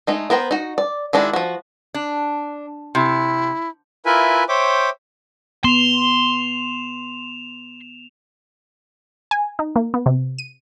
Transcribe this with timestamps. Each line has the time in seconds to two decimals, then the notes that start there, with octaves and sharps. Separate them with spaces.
0.07 G#3 A3 D#4
0.30 B3 A#4 C5 G5
0.51 D#4 F#4
0.78 D5
1.13 D#3 G#3 D4 E4 F#4
1.33 F3 F#4
1.94 D4
2.95 C3 E4
4.06 E4 F4 A#4 B4 E5 G#5
4.49 C5 C#5 E5 G5 D6
5.64 B3 C6 E7 F7
9.31 G#5
9.59 D#4
9.76 A#3
9.94 B3
10.06 C3
10.38 D#7